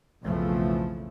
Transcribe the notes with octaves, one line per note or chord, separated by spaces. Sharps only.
B1 F2 C#3 E3 F3 A3